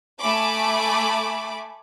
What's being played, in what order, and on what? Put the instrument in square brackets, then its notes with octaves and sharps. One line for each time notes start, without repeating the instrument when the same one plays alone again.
[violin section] A3 G#5 B5 D6